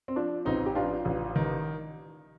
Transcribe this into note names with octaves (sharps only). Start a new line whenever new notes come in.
C4
F3 D4
A1 C4 D#4
G4
F3 D4 F4
A1
D#3